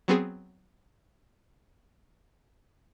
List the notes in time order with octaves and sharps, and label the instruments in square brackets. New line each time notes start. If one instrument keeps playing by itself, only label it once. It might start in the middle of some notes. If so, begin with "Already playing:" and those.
[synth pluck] F#3 B3 C4 G#4